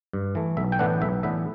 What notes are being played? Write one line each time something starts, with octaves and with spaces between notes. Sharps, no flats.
G2
E3 A3
B1 E5
G5
A2 E3 B3 D4 F#5
B1 E5
A2 E3 B3 D4 E5